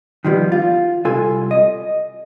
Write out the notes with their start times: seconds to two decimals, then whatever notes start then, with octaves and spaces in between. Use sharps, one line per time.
0.25 D#3 F3 G3 B3
0.52 F4
1.05 C2 F4 A4 G#5
1.51 D#5